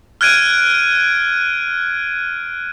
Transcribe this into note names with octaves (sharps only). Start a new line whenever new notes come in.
F6 F#6 G#6 D7 D#7